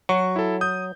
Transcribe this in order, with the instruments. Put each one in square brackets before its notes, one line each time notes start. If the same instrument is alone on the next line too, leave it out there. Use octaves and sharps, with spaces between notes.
[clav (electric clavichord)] F#3 [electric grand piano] F#4 C#6
[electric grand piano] E4 A4
D#6 G6